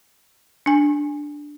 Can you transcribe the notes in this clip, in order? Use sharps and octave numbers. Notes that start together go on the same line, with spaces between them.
D4 G#5